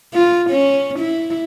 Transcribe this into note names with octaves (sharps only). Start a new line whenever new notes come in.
F4
C#4
E4